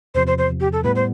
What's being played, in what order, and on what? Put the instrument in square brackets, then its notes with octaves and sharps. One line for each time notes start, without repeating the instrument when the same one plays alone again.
[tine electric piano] E2 C3 F3 [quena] C5
[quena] C5
C5
G4
A4
[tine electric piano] A2 G3 B3 [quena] B4
[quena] C5